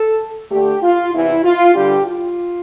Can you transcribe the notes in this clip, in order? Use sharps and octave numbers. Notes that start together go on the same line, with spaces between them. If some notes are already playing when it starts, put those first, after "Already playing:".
Already playing: A4
D3 A3 D4 G4
F4
E2 C3 E3 E4
F4
G2 D3 G3 D4 G4
F4